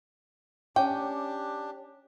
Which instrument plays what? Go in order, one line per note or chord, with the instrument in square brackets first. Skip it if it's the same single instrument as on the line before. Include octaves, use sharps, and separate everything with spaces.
[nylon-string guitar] C#4 [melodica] D4 G4 [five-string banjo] G5